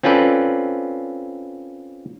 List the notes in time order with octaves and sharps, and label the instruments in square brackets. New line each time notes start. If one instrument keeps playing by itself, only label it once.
[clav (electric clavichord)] C4 C#4 F4 A4 B4 D5